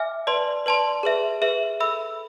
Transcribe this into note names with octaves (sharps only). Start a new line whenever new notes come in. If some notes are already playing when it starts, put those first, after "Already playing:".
Already playing: E5 G#5 D6 F6
B4 D5 A5 C6
B4 D5 A5 C6
G#4 B4 E5
G#4 B4 E5
A4 E5 B5 E6